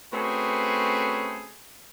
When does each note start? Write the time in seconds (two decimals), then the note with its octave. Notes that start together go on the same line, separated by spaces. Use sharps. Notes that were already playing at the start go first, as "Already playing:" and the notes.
0.12 A3 C4 C#4 F#4 G#4 B4